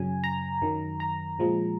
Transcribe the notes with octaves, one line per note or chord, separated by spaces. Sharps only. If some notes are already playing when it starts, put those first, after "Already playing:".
Already playing: F#2 C#3 F#3 G#5
A#5
F#2 D#3 F#3
A#5
A#2 F3 G#3